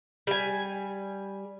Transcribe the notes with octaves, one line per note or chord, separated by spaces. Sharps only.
G3 G#5